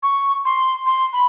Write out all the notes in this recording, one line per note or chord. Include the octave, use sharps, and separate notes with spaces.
C#6
C6
C6
B5